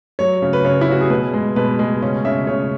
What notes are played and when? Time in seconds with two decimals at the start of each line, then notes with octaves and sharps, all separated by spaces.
0.19 F#3 C#5
0.42 C#3
0.53 B4
0.65 C#3 C#5
0.81 E4
0.88 C#3 F#4
1.01 G#4
1.10 B2 B4
1.33 G#3
1.56 B2 B4
1.79 G#3
2.02 C#3 C#4
2.25 C#3 E5
2.47 C#3 C#5